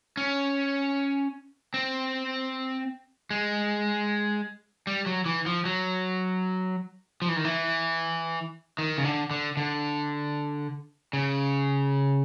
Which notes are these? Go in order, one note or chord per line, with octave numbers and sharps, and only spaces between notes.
C#4
C4
G#3
G3
F#3
E3
F3
F#3
F3
E3
D#3
E3
D#3
C#3
D3
D3
D3
C#3